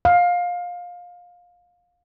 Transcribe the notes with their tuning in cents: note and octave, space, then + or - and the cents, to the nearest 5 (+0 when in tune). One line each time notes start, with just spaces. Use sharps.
F5 +20